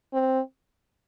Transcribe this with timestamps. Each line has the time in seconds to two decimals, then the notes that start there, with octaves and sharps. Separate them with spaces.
0.13 C4